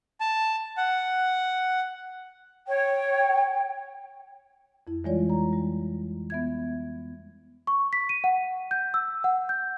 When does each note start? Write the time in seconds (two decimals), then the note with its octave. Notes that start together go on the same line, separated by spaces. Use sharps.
0.20 A5
0.77 F#5
2.67 C#5 G5
4.87 F2 E4
5.04 E3 G3 G#3 F4 C#5 D5
5.30 A#5
5.53 G3
6.30 B3 E5 G#6
7.67 C#6
7.93 B6
8.09 D#7
8.24 F#5
8.71 G6
8.94 E6
9.24 F#5
9.49 G6